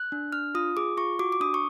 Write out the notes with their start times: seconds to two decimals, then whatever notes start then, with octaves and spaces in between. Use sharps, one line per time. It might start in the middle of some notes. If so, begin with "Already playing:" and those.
Already playing: F#6
0.12 D4
0.32 D4 F6
0.55 F4 D#6
0.77 G#4 D6
0.97 F4 C#6
1.19 F#4 D6
1.32 D6
1.40 D4 D#6
1.54 C#6